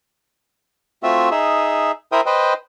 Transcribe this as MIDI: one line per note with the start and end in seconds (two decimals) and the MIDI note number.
1.03 1.29 57
1.03 1.29 60
1.03 1.29 65
1.03 1.29 66
1.03 1.29 76
1.31 1.92 63
1.31 1.92 68
1.31 1.92 76
2.12 2.21 64
2.12 2.21 70
2.12 2.21 72
2.12 2.21 76
2.12 2.21 79
2.12 2.21 87
2.26 2.54 71
2.26 2.54 72
2.26 2.54 75
2.26 2.54 79